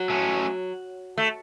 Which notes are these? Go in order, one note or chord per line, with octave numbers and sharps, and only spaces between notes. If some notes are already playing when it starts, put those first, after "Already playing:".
Already playing: F#3
A3 C#4
A3